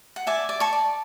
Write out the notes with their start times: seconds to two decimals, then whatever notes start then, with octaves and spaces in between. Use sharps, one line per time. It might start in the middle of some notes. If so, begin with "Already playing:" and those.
0.16 F#5
0.27 D5 E5 G#5
0.49 D5
0.60 A5 C#6
0.73 D5